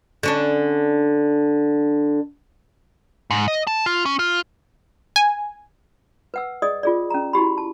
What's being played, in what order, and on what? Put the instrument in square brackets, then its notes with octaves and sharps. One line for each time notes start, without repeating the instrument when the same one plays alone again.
[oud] D3 C#4 D4
[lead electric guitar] G#2
D#5
A5
F4
C#4
F4
[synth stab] G#5
[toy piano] B4 F#5 E6
G#4 D5 D#5 D#6
F4 G#4 D5
C#4 A#5
E4 F#4 G4 B5
A5